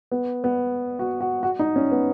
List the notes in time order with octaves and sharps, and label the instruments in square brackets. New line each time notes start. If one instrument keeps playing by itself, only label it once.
[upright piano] B3
B3
F#4
F#4
F#4
D#4
C#4
B3